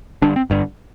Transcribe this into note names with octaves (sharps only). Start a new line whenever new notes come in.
G1 G2 D3 D4
C4
G1 G2 D3